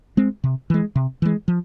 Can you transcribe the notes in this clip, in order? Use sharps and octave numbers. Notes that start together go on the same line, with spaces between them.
G#3 C4
C3
E3 G#3
C3
E3 G#3
F3